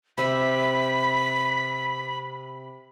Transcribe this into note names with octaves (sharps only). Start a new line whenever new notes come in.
C3 E5 B5 B6